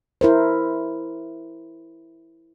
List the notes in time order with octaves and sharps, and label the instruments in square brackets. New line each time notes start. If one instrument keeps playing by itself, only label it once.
[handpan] E4 A#4 C5